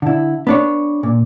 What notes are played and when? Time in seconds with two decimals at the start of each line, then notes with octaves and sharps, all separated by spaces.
0.02 D3 E4
0.47 B3 D4 C#5
1.03 A#2